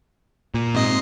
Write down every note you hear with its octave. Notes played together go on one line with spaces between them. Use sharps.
A#2
G#2 C3 D#5 C7